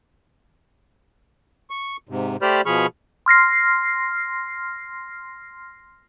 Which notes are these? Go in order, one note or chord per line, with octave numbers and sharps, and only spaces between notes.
C#6
G#2 C3
A3 G4 C5 D5 B5 F6
B2 F3 G#4 B5 C#6 F6
C6 F6 A#6 C7